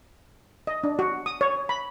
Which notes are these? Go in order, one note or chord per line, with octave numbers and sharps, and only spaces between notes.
D#5
D4
F#4
D#6
C#5
B5